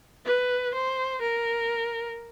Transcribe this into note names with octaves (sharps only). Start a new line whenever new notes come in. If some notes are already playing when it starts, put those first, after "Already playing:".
B4
C5
A#4